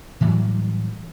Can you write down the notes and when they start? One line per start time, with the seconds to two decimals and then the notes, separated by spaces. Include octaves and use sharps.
0.21 A2 E3 F#3 G3